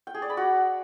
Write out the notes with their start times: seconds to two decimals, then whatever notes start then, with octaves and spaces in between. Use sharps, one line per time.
0.07 G5
0.15 G#4
0.22 D5
0.30 B5
0.37 F#4